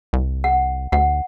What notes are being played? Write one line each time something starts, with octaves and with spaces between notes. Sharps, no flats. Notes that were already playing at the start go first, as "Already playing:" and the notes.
C2
F#5
D2 F#5